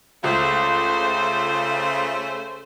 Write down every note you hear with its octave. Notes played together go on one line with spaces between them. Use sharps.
C#2 C#3 A3 C5